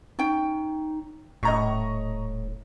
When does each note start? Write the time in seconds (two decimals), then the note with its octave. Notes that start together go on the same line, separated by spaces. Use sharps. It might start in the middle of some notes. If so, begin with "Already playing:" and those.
0.19 C#4 D#4 G5
1.43 D#1 A2 D#5 A#5 C#6